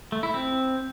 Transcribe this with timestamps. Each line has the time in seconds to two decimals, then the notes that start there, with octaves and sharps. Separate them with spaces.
0.12 A3
0.23 E4
0.34 C4